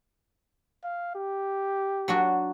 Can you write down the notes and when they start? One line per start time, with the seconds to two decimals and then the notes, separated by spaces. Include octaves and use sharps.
0.84 F5
1.15 G4
2.08 F#3 D4 F#4